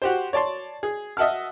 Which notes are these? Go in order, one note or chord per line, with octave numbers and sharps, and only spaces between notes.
F#4 G4 C5
C#5 D5 A5 C6
G#4
D#5 E5 F#5 A5 F6